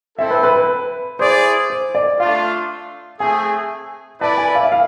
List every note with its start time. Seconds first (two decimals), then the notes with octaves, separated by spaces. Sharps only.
0.18 C4 E4 A4 E5
0.31 B4
0.43 B4
0.56 B4
1.19 E4 G#4 C5 D5
1.70 C5
1.95 D5
2.20 A3 D4 F4 F5
3.20 A3 C4 G#4 G#5
4.21 E4 B4 D5 A5
4.38 G#5
4.55 F5
4.63 E5
4.72 F5